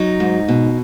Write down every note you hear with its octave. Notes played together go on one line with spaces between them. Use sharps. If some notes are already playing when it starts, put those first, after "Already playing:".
Already playing: F#3 D#4
G#2
B2